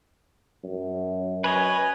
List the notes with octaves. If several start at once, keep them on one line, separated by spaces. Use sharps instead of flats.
F#2
B4 C#5 D#5 G#5